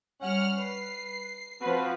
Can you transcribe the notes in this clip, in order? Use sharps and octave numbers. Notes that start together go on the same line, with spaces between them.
G3 C#4 F#5 F6
B4 C7
F3 C4 F#4 B4